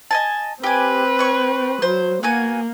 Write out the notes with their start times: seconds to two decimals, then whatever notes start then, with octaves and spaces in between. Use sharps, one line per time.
0.11 D#5 G#5 A5
0.63 C4 G4 B4 G#5
1.19 C#5 C#6
1.82 F#3 C5
2.23 A#3 B3 F#4 G#5